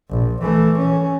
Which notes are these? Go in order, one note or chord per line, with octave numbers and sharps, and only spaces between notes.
A#1
E3 A3
C#4